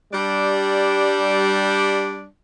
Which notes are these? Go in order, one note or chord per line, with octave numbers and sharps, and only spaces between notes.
G3 D4